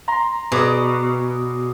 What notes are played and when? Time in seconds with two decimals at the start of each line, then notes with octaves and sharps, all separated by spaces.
0.08 A#5 C6
0.52 B2 G#4 D5 D#6